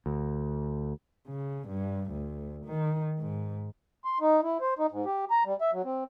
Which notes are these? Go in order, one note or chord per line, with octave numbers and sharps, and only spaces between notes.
D2
C#3
G2
D2
D#3
G#2
C6
D#4
E4
C5
D#4
G#2
G4
A#5
G3
E5
F#3
C4